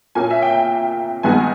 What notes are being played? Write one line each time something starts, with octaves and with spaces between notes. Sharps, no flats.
A#2 A#3 C#4 G#5
E5
G5
G2 D#3 G#3 B3 D#4 G#5